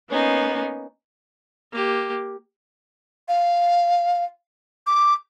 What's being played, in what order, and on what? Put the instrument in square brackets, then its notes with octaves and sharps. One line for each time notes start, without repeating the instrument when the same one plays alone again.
[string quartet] A#3 B3 C#4 D#4
[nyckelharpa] A#3 G4
[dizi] F5
D6